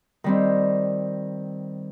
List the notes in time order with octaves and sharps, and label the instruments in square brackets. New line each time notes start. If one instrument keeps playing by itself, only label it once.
[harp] D#3 G3 C4